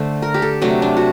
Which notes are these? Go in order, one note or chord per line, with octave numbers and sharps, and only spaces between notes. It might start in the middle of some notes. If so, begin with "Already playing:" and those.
Already playing: D3 A3 C5
A#4
G4
A4
C3 F#3 A3 D4
D4
F#4